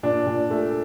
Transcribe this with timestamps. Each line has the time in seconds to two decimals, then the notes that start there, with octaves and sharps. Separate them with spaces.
0.03 A#2 D4
0.27 A#2
0.50 A3